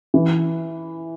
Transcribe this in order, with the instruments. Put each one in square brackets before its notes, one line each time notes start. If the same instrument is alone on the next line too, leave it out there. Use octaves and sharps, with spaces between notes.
[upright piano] E3